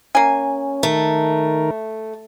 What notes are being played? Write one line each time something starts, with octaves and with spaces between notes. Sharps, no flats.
A#3 C#4 G#5
D#3 A3 A#4